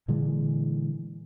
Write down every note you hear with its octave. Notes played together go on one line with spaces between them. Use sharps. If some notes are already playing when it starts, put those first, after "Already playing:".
A#2 D3 E3 G#3